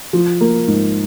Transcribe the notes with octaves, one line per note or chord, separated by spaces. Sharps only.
F3
A#3
G#2